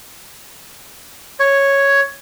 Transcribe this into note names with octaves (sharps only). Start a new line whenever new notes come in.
C#5